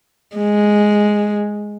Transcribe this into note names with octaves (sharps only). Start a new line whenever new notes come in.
G#3